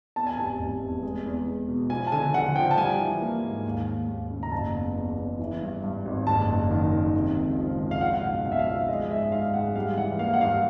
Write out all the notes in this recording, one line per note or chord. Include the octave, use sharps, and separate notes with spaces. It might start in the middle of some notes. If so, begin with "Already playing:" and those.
E2 A5
G#5
F1 A5
F1
E2
G#3
E2
G#3
B2
F3 G#5
A5
D3 G#5
D3 F#5
F3 G5
A5
G3 G#5
E3
A#3
G#2
D#2
D#2
D#2
C#3
A#5
F#1 A5
E2
E2
E2
E3
G2
G2
G#1
F#1 A5
F#1
D#3
D#3
C3
C#2
F3
C#2
F5
F3 F#5
F5
B1 F#5
B1 F5
E5
F5
F3 E5
G#3 D#5
D#5
G#2 E5
G#2 F5
G#3 F#5
G3 F5
E3 F#5
A#3 F5
F#5
G2 F5